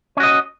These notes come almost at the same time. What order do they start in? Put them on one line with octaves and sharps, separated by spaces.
C#4 F#4 D#5